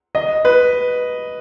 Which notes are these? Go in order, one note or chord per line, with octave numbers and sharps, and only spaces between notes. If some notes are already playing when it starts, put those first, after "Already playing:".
D#5
B4